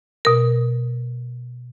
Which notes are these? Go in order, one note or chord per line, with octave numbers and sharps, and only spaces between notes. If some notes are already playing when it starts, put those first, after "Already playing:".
B2 A#4